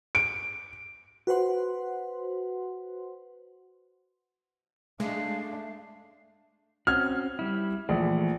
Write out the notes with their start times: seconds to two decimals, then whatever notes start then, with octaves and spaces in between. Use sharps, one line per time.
0.15 D7
1.27 F#4 B4 C5 F#5 C6
5.00 G#3 A3 D4 F5
6.87 C4 C#4 F#4 F6 G#6
7.39 G3 E4
7.89 A#1 E3 A3 G#4